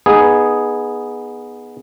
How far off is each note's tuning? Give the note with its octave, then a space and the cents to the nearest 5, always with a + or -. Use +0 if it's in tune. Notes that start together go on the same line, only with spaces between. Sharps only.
B3 -10 D#4 +0 G#4 +0